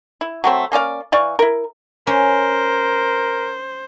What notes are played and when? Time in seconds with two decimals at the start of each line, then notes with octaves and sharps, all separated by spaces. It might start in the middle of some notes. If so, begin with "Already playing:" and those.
0.21 E4
0.44 F#3 A3 C4
0.72 A#3 C#4 D5 F5
1.12 E3 D5 F5 C#6
1.39 E4 A#4
2.07 C#4 A#4 C5